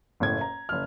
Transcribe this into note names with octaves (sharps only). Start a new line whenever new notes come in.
F#1 A2 G#6
A#5
F#1 F6